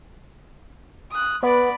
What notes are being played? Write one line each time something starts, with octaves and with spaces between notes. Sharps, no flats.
D#6 F#6
B3 D5 B5